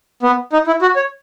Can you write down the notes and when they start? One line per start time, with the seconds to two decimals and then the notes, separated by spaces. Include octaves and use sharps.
0.23 B3
0.53 D#4
0.67 E4
0.82 F#4
0.96 C#5